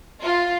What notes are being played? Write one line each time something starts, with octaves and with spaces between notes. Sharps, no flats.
F4